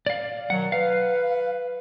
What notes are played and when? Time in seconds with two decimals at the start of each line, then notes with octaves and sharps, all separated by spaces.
0.06 D5 F5
0.50 B2 D#3 F#3 F#5
0.72 B4 F5